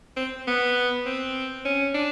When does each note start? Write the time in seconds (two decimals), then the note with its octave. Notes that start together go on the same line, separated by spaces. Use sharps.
0.16 C4
0.47 B3
1.06 C4
1.65 C#4
1.94 D4